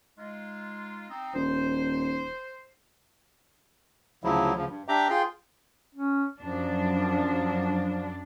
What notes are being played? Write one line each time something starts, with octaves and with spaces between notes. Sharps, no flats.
G#3 D#4 F4
C4 D#4
D#1 C5
D2 C#3 F3 F#3 E4
D2 C#3 F3
G2
D4 G4 E5 G5 A#5 D6
F4 G#4 G5 C6
C#4
F#2 F3 D4